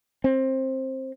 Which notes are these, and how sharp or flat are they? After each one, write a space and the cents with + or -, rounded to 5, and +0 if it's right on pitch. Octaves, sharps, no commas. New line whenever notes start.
C4 +15